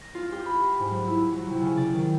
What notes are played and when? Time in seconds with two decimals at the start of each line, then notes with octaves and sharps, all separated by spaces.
0.01 A#6
0.15 F4
0.32 G4
0.45 B5
0.79 G#2
0.91 F#3
1.07 E4
1.32 F#3
1.50 C3
1.62 C#3
1.77 D5
1.94 D#3